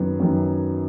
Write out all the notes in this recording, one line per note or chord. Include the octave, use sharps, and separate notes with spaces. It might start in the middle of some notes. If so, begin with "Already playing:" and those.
Already playing: F#2 D#3 F#3 B3
F#2 D#3 F#3 B3